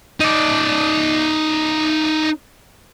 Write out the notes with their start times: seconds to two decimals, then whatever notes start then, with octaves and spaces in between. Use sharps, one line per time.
0.20 D#4 D5